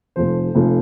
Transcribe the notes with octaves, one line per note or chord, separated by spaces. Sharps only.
F1 F2 F3 C5
F1 F2 F3